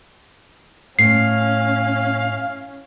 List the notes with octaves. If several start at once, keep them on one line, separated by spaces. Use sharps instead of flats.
A2 C#4 F5 C7